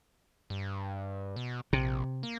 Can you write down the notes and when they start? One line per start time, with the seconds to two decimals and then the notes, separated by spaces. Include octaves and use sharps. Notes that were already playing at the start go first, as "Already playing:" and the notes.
0.50 G2
1.36 B2
1.73 A#1 C3
2.23 A#3